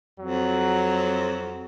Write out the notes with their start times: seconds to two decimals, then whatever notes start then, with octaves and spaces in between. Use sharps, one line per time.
0.19 F2 F#3